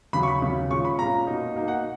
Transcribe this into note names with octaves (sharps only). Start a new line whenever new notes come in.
D#2 C#3 F#3 B5
C#6
B5
D#2 C#3 F#3
A#2 G#3 C#4 F4 C#6
B5
A#2 G#3 C#4 F4 A#5
B2 A#3 D#4
B2 A#3 D#4
F#5